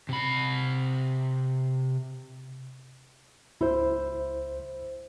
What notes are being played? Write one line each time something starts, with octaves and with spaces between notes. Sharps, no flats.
C3 B5
C#2 E4 C5